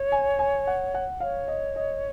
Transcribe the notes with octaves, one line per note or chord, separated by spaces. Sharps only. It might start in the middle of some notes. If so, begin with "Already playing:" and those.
Already playing: C#5
G#5
G#5
F#5
F#5
C#5 F5
D#5
D#5